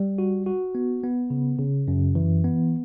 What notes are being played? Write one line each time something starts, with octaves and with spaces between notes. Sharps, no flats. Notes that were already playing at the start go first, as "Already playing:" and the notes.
Already playing: G3
F#4
F#4
B3
B3
C#3
C#3
F#2
E3
B3